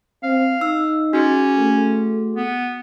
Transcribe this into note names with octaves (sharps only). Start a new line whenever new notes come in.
C4 F5
D#4 E6
C#4 F#4 G#4
A3
B3